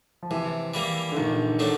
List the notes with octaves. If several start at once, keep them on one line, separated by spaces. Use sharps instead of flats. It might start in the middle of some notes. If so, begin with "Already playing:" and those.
F3
C3 E3
E3 G3 A#3
D3
A#1 D#3
A2 F#3 A3 D4